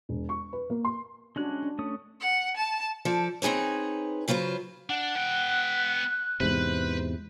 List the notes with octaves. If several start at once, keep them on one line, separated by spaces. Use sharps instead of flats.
E1
C#6
B4
A#3
C6
G#3 C#4 D4 F#4 F#6
D4
A3 C#4 D#6
F#5
A5
F3 A4 D5
C4 D#4 G#4 B4 C#5
C#3 F#3 F4 B4 C5
D4 F#5
B3 G5 F#6
E2 G#2 C3 B4 C5